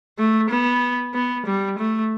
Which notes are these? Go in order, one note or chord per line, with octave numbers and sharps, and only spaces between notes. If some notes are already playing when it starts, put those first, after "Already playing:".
A3
B3
B3
G3
A3